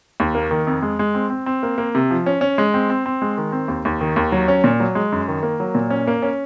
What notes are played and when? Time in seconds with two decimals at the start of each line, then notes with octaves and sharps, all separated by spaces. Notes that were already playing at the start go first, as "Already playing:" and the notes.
0.20 D#2
0.35 A#3
0.51 D#3
0.67 F2
0.83 G#3
0.99 G#3
1.15 C4
1.30 C4
1.46 C4
1.63 A#3
1.78 A#3
1.95 C3
2.11 F3
2.26 C#4
2.41 C#4
2.58 G#3
2.74 C4
2.90 C4
3.06 C4
3.22 G#3
3.38 D#3
3.52 C4
3.68 D#2
3.85 D#2
4.01 D#3
4.16 D#2
4.32 F#3
4.48 C#4
4.64 A#2
4.80 F#3
4.95 G#3
5.12 F#2
5.28 D#3
5.43 A#3
5.60 F#3
5.75 A#2
5.90 C#4
6.07 A#3
6.22 C#4